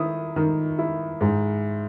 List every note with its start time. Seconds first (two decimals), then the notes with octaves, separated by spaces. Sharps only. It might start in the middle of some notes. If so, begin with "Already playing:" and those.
Already playing: D#3 E4 D#6
0.36 D#3
0.79 E4
1.21 G#2